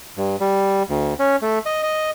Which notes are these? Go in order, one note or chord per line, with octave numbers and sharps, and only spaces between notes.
G2
G3
D2
C#4
A3
D#5
D#5